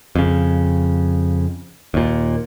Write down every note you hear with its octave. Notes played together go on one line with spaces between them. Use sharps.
F2 C#3
D#2 A#2